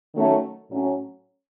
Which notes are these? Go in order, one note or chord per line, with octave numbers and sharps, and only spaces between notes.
D#3 F#3 A3 C#4
A2 F#3 C#4